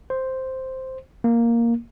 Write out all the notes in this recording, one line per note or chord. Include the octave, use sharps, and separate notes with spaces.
C5
A#3